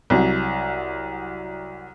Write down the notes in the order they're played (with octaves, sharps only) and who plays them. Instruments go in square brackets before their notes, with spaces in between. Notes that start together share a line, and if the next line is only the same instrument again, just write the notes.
[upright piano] C2 F#3